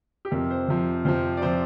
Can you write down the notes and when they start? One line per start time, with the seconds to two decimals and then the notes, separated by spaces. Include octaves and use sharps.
0.25 G4
0.31 F2 C3 F3 A#4
0.50 C5
0.68 F2 C3 F3
1.05 F2 C3 F3 C5
1.37 D5
1.42 C3 F3 C5